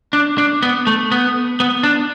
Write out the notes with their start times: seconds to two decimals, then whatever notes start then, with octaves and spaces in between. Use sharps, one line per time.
0.13 D4
0.38 D4
0.63 B3
0.87 A3
1.12 B3
1.60 B3
1.83 D4